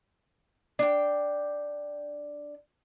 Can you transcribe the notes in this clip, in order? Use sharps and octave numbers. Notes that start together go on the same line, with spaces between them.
D4 G5